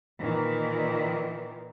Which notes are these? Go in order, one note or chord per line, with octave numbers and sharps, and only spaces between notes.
A#2 D#3 E3